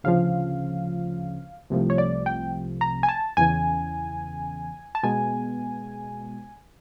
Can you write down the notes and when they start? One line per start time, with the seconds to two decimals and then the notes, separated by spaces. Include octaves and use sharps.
0.04 D2 C#3 F3 F5
1.70 C2 C3 F3 A3
1.90 C#5
1.98 D5
2.26 G5
2.81 A#5
3.03 G#5
3.09 A5
3.37 E2 C#3 E3 G#5
4.95 A5
5.03 B2 G#3 B3 G#5